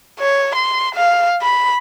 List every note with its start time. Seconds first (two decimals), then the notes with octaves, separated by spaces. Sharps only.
0.20 C#5
0.56 C6
0.95 F5
1.42 B5